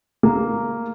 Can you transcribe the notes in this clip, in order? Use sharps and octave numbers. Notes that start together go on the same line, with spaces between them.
A#3